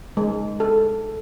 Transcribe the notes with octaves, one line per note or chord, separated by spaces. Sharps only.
G#3
A4